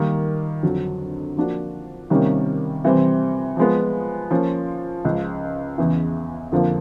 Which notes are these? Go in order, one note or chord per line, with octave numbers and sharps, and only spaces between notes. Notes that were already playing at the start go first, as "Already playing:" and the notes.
Already playing: D#3 G3 A#3 D#4
F2 D3 F#3
F3 A#3 D4 F#4
C3 D#3 G3 A#3 C#4
C3 E3 G3 C4
F3 G#3 B3
F3 A#3 C#4 F4
C#2 C#3 F3
E2 C#3 E3
F2 D3 F3 A#3